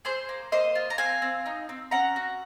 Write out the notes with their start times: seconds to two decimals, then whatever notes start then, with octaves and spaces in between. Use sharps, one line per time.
0.05 G#4 C5
0.29 A#3
0.52 A#3 C5 D#5
0.75 F4
0.90 A#5
0.98 C4 F5 G#5
1.22 C4
1.46 D#4
1.69 C4
1.91 C#4 F#5 A#5
2.16 F#4